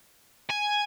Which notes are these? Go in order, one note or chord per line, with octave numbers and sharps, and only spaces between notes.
G#5